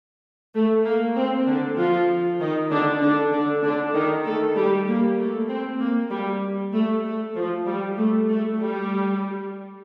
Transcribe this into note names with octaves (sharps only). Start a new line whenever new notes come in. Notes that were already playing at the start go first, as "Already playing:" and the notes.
A3
A#3
C4
D3 D4
F3 F4
D#3 D#4
D3 D4
D3 D4
D3 D4
D3 D4
D#3 D#4
A3 A4
G3 G4
A#3
A3
C4
A#3
G3
A3
A3
F3
G3
A3
A3
G3